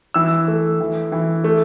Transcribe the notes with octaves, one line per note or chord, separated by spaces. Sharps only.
E3 E6
A3
E3
E3
A3